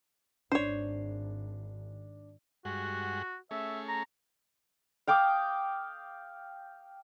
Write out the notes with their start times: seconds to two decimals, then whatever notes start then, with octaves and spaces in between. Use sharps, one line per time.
0.52 G#1 D4 C5 C#5
2.65 G2 G#3 F#4 F#5
3.51 A3 C#4 G#4 E5
3.88 A#5
5.07 F5 G5 D6 D#6